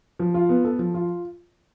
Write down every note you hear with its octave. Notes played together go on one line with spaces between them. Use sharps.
F3
F4
B3
A4
F3
F4